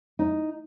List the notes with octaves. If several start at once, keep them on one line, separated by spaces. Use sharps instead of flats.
D#4